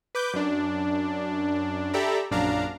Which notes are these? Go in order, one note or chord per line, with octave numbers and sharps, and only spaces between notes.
B4 D6 G6
F#2 D4
G4 A4 D5 E5 A#5 B5
A#1 F#2 D4 F5 A#5